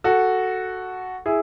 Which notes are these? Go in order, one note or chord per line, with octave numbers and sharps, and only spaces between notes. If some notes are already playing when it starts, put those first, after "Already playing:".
F#4 A4
E4 G#4